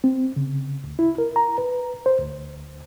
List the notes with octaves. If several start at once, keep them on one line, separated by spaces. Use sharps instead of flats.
C4
C#3
D2
E4
A#4
A#5
B4
C5
D2